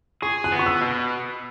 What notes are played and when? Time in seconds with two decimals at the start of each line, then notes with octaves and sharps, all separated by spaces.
0.22 G#4 C#6
0.44 F#6
0.52 B3
0.59 C#6
0.66 E6
0.81 B2